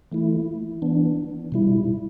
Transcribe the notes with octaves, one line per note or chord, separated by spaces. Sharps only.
E3 A3 E4
E3 B3 D4
B2 G3 E4